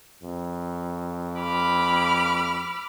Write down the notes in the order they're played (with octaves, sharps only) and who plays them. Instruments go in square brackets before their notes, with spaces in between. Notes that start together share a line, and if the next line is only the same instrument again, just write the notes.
[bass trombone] F2
[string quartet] B5 D6 F6